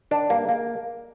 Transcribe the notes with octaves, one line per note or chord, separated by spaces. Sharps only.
D#3 D4
G2 A#3
G#3 A#3